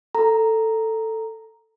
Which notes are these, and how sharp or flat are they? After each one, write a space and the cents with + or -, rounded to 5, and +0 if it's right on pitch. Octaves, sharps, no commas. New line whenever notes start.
A4 +10 A#5 +0